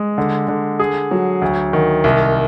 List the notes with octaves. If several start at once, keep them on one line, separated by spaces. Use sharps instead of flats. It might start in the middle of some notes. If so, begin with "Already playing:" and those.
Already playing: G#3
D3
D3
G#4
F#3
D2
D#3
C2